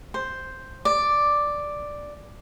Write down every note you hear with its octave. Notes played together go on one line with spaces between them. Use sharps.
C5
D5